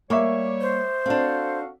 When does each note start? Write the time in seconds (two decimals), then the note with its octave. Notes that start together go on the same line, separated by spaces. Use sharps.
0.10 G3 A#3 C#5 E5 C#6 D6
0.61 C5
1.06 C4 D4 F#4 A4 F5